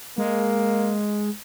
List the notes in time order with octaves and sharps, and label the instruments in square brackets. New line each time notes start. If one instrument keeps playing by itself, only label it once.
[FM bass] G#3 [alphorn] A#3